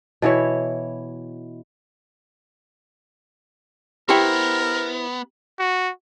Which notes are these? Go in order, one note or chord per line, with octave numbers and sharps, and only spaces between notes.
B2 E3 E4 C#5
B3 E4 G4 A#4 C5 G5
F#4